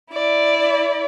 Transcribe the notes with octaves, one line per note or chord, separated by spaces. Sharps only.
E4 D5